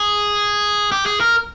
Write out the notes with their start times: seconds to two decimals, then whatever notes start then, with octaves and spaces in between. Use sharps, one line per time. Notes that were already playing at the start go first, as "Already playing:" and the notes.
Already playing: G#4
0.92 G4
1.06 G#4
1.20 A#4